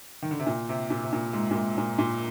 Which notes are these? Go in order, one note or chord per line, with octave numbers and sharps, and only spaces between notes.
D#3
D3
C3
A#2
C3
A#2
C3
A#2
G#2
A#2
G#2
A#2
A#2